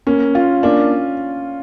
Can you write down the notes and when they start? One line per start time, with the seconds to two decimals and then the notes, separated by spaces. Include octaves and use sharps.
0.07 A#3 C#4
0.35 F4
0.63 A#3 C#4 D4